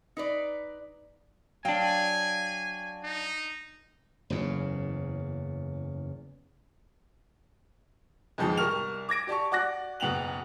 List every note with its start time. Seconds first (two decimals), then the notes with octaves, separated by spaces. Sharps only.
0.17 D#4 B4 D5
1.65 F#3 D4 F5 G5 G#5
3.04 D#4
4.30 F#1 E2 C#3
8.38 F2 G#2 B2 D#3 F3 G#3
8.57 C2 A#4 C#6 F6 F7
9.09 D6 G#6 A#6 D7
9.27 G4 D5 A5 C#6
9.52 F#4 D5 D6 F#6 A#6
10.00 F#1 B2 B3 G5 F7 F#7